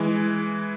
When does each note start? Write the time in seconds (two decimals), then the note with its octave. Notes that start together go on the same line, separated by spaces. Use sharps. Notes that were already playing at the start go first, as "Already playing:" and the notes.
Already playing: E3 G#3